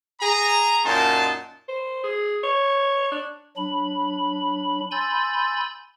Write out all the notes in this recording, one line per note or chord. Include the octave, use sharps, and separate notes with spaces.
G#4 A#5
F#2 A#2 D#4 A5 C6
C5
G#4
C#5
D4
F#3 D4 B5
G#5 B5 C6 E6 G6 A6